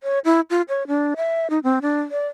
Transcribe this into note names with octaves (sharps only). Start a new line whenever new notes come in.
C#5
E4
F4
C#5
D4
E5
D#4
C4
D4
D5